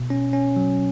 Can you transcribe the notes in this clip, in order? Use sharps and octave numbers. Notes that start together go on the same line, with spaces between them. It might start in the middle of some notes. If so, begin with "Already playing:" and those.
Already playing: B2
C#4
C#4
F#3